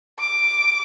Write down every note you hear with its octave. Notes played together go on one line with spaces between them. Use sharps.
D6